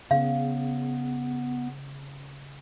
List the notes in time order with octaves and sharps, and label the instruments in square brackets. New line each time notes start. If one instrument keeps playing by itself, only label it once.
[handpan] C#3 [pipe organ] B3 [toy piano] F5